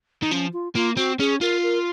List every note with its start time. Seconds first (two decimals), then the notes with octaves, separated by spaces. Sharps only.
0.22 D#3
0.31 F3 C#4
0.53 F4
0.75 A#3 F4
0.97 C4 F#4
1.19 C#4 G#4
1.41 F4 A#4
1.63 A#4